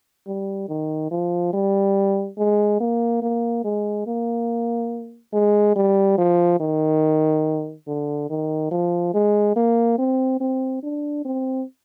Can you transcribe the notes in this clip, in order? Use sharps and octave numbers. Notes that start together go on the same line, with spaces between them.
G3
D#3
F3
G3
G#3
A#3
A#3
G#3
A#3
G#3
G3
F3
D#3
D3
D#3
F3
G#3
A#3
C4
C4
D4
C4